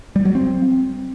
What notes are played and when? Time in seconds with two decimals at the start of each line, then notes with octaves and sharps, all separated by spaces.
0.16 G3
0.25 F#3
0.35 C4